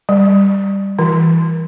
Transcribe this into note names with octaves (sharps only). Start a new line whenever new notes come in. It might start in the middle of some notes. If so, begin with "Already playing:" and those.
G3
E3